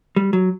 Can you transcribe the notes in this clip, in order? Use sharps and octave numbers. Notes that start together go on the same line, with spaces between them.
G3
F#3